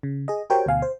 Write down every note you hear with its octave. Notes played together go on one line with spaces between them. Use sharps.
C#3
G#4 D#5
F#4 G4 A#4 C5 C#5 G5
D2 B2 F5 G#5
C5